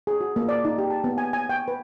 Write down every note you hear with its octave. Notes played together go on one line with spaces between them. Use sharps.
G#4
F#4
A#3
D5
D#4
G4
A5
B3
G#5
G#5
G5
B4